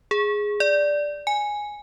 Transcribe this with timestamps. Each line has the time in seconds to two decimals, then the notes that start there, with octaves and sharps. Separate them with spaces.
0.11 G#4
0.60 D5
1.27 G#5